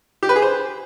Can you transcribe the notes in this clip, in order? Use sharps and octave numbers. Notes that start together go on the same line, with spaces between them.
G4
B4
G#4
C5